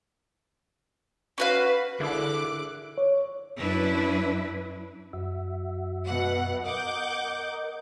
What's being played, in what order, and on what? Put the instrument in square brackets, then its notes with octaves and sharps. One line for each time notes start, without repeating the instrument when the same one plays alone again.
[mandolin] C#4 F#4 F5 [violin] B4
[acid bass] D3 [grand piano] E4 [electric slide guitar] G#4 A#4 [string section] D6 F#6
[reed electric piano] C#5
[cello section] F#2 D4 E4 B4
[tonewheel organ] F#2 F#4 E5
[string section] B2 F#5
[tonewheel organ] A#4 D#5 [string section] F#5 D6 G6